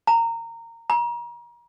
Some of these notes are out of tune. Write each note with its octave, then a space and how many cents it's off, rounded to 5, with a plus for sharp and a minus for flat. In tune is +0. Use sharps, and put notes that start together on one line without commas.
A#5 -20
A#5 +35